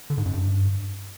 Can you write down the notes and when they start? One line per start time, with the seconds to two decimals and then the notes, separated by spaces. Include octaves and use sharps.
0.10 D3
0.18 G#2
0.25 F#2
0.33 G2